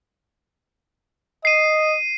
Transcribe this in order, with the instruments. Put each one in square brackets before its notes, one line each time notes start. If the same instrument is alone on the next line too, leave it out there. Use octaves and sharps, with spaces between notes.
[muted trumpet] D#5 [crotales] C7 D#7